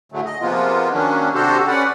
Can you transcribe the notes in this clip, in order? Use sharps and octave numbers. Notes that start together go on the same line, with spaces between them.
A2 D3 F#3 G#3 A3
D#5
C3 F3 G#3 A#3 B3 F4
D#3 F#3 A#3 C#4 D4
C3 D4 F#4 G4 A4 C5
C#4 B4 D5 F#5